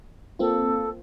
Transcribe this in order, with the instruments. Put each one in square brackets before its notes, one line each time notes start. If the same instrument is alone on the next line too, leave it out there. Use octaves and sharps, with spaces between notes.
[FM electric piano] A#3 C4 F4 [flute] A4